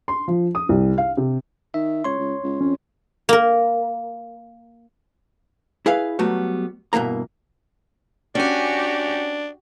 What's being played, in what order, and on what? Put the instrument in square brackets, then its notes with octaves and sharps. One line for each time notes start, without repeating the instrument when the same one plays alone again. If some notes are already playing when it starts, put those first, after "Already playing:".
[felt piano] C6
F3
D#6
C2
F5
C3
[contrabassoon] D#3 [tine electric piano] E5
[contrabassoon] C#2 [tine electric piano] C#5 C6
[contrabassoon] C#2
C#2
[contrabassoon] F2 [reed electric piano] C#4
[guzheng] A#3 A#4
[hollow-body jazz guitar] E4 G#4 B4 F5
F#3 G3 A3 B3 F#4
G2 B2 E3 A#3 A#5
[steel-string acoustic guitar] C#4 G#5 [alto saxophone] D4 [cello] F#4 G4